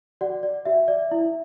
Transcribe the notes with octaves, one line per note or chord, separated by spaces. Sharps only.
F#4 D5 F#5
D5
F#4 E5
D5
E4